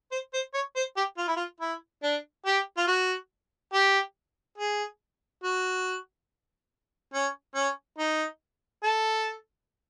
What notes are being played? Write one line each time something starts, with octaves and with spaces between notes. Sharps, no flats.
C5
C5
C#5
C5
G4
F4
E4
F4
E4
D4
G4
F4
F#4
G4
G#4
F#4
C#4
C#4
D#4
A4